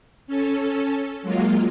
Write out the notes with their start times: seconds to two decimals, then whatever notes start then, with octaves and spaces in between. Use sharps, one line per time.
0.27 C#4 A4
1.22 F#3 G#3 A#3 F4